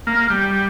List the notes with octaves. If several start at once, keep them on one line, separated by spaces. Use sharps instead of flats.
A#3
G3